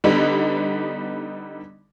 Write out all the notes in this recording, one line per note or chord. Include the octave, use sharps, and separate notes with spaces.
D3 G3 B3 D4 D#4